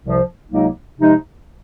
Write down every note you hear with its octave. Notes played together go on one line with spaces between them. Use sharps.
C2 C3 F3
C#2 C3 F#3 A#3 D#4
C3 F3 G#3 D#4